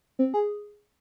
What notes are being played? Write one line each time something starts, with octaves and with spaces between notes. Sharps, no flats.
C4
G#4